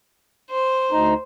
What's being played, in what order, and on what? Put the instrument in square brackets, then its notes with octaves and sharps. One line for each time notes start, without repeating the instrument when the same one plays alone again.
[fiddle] C5
[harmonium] D2 D#4